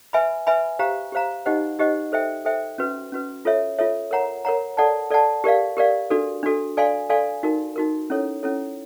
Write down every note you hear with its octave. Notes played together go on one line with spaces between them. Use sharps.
B4 E5 G#5 B5
B4 E5 G#5 B5
G4 C5 F5 A#5
G4 C5 F5 A#5
D#4 G4 C5 D#5 F#5
D#4 G4 C5 D#5 F#5
A4 C5 E5 G5
A4 C5 E5 G5
C#4 F#4 B4
C#4 F#4 B4
F4 A4 C#5 E5
F4 A4 C#5 E5
A#4 C#5 F#5 A#5
A#4 C#5 F#5 A#5
A4 D5 F#5 A5
A4 D5 F#5 A5
G4 A#4 D5 F5
G4 A#4 D5 F5
D4 F#4 A4
D4 F#4 A4
A4 D5 F5 G#5 C6
A4 D5 F5 G#5 C6
D#4 F#4 A#4
D#4 F#4 A#4
C#4 E4 A4 C#5
C#4 E4 A4 C#5